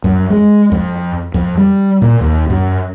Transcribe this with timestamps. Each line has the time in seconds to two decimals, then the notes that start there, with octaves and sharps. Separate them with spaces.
0.04 F#2
0.30 G#3
0.72 F2
1.34 F2
1.57 G3
2.02 A#2
2.21 D#2
2.50 F#2